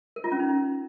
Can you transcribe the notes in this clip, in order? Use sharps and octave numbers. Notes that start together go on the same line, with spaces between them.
A#4
F4
C#4
D#4